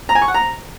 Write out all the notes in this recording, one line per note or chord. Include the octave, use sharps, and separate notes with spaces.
A#5
G#5
C#6
F#5
A#5